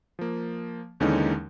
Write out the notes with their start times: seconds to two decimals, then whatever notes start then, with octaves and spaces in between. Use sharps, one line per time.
0.19 F3 A#3
1.00 D#2 D3 E3 G#3 C#4 D#4